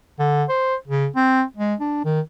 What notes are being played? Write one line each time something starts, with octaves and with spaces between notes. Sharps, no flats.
D3
C5
C#3
C4
G#3
D4
D#3